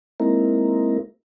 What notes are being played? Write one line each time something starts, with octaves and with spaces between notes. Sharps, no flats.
G#3 A#3 C4 D#4 E4 A#4